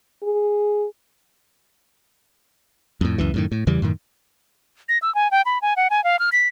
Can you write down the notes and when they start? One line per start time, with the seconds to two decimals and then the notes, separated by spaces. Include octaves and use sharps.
0.23 G#4
3.01 F2 A2
3.18 C#2 F#2 E3
3.34 F#2 A2 D#3
3.52 A2
3.67 E2 C#3 E3 G3
3.82 F#2 A2 D#3
4.89 A#6
5.02 E6
5.15 G#5
5.31 G5
5.46 B5
5.62 G#5
5.77 F#5
5.90 G#5
6.04 F5
6.19 F6
6.32 B6